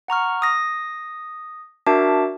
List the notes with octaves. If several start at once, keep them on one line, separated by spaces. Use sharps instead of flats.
F#5 A#5 C#6 F6
D#6 A#6
D4 F#4 A#4 E5 A5 D6